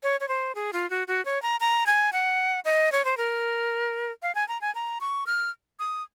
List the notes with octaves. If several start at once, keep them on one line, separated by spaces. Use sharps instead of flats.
C#5
C#5
C5
G#4
F4
F#4
F#4
C#5
A#5
A#5
G#5
F#5
D#5
C#5
C5
A#4
F5
G#5
A#5
G#5
A#5
C#6
F6
D#6